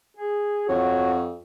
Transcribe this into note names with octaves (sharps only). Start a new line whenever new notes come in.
G#4
F2 F#4 C#5